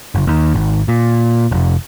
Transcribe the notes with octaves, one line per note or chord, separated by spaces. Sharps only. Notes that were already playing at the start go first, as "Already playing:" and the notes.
F#1
D#2
G#1
A#2
F1